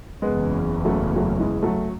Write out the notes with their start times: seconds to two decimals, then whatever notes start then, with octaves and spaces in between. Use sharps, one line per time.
0.22 F#1 E2 C#3 G#3 B3
0.85 F#3 A3
1.16 F#3 A3
1.40 E3 G#3
1.63 F#3 A3